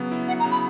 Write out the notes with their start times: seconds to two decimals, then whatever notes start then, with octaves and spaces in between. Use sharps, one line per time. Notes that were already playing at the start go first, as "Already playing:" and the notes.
Already playing: C#3 F#3 B3
0.12 E4
0.28 F#3 F#5
0.40 A#5
0.45 C#3
0.52 B5